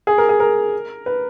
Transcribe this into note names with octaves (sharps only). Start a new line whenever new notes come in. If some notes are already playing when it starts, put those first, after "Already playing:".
G#4
A#4
G#4
A#4
B4